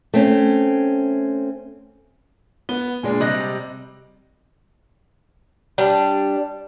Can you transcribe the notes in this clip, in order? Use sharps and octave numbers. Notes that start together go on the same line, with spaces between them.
A3 C4 C#4
B3 G7
A#2 G#3 D4
C3 G3 D5 D#5 F#6 A#6
G3 D4